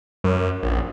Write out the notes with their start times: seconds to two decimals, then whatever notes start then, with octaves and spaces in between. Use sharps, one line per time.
0.24 F#2
0.63 A#1